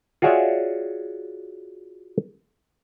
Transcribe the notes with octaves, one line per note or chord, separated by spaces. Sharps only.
F4 F#4 G#4 C#5 D5 E5